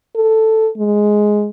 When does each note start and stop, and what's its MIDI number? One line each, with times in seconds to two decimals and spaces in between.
0.16 0.69 69
0.77 1.49 56